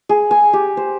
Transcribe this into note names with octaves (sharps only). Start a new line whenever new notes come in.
G#4
G#5
G4
C5